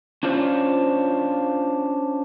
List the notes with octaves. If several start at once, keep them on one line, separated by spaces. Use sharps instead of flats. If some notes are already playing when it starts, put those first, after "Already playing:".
C#4 D4 F4 C5 C#5